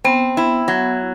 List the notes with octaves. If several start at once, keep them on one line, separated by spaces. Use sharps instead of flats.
B3 C4
E4
F#3